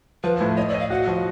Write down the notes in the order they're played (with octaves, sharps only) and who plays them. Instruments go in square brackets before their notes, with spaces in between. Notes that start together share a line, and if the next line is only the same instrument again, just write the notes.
[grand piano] F3 [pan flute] B4
[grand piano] A2
[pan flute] C#5 [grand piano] D#5
[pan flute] D5
[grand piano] D#5
[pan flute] F5
[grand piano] F#4 [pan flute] F#5
[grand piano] F3